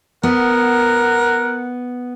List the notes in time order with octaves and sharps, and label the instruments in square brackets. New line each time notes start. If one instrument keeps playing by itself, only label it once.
[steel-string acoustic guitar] B3 [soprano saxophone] A#4 [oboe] F#5